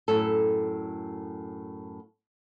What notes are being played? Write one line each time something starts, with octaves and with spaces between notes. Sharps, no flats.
F#2 A2 A4